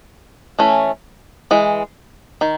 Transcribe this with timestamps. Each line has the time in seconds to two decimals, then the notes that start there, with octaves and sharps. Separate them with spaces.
0.59 E3 A3 C#4
1.51 E3 G#3
2.41 D#3